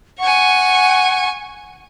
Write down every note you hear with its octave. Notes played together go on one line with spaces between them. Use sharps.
F#5 G#5 C#6